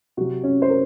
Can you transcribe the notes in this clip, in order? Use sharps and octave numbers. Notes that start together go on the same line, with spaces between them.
C3 F#3 F#4
C#4
C5
A#4